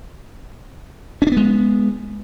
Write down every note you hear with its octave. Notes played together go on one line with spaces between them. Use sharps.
G#3 B3 C#4 D4